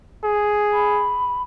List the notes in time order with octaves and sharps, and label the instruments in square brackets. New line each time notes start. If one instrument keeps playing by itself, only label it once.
[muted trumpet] G#4
[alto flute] B5